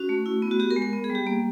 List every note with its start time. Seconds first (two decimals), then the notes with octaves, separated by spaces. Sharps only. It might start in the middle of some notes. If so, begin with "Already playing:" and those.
Already playing: C#4 F#4
0.09 A3
0.26 E4
0.42 B3
0.51 F#4
0.59 B3 G4
0.71 A#4
0.76 G#3
0.82 A#4
0.93 B3
1.04 G#4
1.10 G3
1.15 G4
1.27 A#3